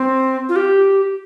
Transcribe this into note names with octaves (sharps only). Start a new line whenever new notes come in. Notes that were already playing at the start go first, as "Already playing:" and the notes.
Already playing: C4
F4
G4